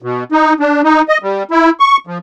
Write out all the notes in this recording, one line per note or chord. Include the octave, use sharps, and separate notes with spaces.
B2
D#4
D4
D#4
D#5
G3
E4
C#6
F3